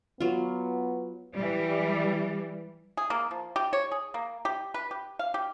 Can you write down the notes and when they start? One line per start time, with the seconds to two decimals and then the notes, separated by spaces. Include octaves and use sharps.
0.20 F#3 B3 F4
1.34 E3 G3
2.97 G#4
3.10 A#3
3.31 F3
3.56 G4
3.73 C#5
3.91 G#4
4.14 A#3
4.45 G4
4.74 B4
4.91 G4
5.19 F5
5.34 G4